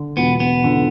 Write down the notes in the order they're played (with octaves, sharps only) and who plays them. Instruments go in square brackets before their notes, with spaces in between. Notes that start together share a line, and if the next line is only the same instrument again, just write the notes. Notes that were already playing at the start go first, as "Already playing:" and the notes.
Already playing: [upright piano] D3
[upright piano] E1 [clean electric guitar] B3
[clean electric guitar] B3
[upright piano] D3